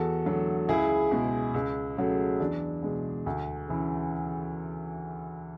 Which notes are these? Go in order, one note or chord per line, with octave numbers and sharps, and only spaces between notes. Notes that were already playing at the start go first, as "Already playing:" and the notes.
Already playing: E2 F#4 A4
D3 F#3 A3
C#2 E4 G#4
B2 G#3
C#2
C#3 F#3 A3
E2 D4
B2 G#3
D2
C#3 E3